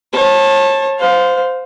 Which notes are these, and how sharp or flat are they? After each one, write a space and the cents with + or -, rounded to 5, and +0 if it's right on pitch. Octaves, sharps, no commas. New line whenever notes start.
C#5 -35 A5 +0
C5 -15 F5 +20